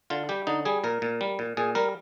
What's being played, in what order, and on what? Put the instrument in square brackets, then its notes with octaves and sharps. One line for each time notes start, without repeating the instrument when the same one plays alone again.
[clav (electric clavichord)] D3 F4
G3 G4
D3 D#4
G3 G#4
A#2 A#4
A#2
G3
A#2
A#2 G#4
G3 A#4